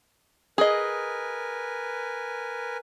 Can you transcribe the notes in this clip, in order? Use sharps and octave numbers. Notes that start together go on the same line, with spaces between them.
G#4 A#4 B4 D#5 G#5